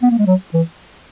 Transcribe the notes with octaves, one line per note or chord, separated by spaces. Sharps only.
B3
A#3
G#3
F#3
E3